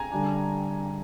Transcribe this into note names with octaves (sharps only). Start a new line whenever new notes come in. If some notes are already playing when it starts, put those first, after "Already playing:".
Already playing: G#5 A#5
D3 G3 D4